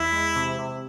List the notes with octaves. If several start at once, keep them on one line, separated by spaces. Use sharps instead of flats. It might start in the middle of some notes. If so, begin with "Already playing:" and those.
Already playing: E2 E4
G#3
C3
C3